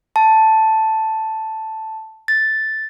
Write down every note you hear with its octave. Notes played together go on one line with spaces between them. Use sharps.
A5
A6